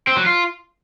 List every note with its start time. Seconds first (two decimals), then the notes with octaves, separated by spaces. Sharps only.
0.07 C4
0.17 F#3
0.26 F4